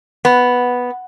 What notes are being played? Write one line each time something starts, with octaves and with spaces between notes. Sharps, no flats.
B3